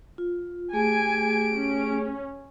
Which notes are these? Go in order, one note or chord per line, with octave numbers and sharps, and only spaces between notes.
F4
A3 G4 G#4 G#5 D7
C#4